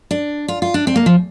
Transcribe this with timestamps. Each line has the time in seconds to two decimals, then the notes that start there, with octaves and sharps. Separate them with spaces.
0.11 D4
0.48 F4
0.62 F4
0.74 D4
0.87 C4
0.96 A#3
1.06 F3